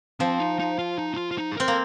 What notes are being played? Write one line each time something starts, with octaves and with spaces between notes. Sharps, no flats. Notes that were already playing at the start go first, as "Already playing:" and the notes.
F3 C4
D#4
D#4
F4
D#4
D#4
F4
F4
D#4
G#4
C4 A#4
A#3